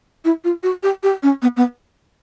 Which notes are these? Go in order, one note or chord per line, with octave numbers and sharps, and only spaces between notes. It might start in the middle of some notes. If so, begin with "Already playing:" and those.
E4
F4
F#4
G4
G4
C#4
B3
B3